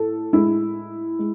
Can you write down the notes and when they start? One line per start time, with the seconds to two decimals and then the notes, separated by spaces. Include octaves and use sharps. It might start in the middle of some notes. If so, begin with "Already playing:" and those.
Already playing: A2 A4
0.33 A2 G#3 E4
1.19 G#3